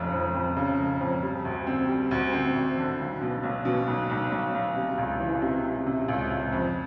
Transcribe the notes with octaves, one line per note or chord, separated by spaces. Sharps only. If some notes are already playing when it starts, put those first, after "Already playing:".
Already playing: F1 F2 C#3
F2
F2
C#3
F1
F2
G3
D2
C4
G3
D2
C4
D2
D3
B1
B2
B1
B2
B1
B1
B1
B1
C3
C#2
E3
C3
C3
C3
C#2
C#2
F2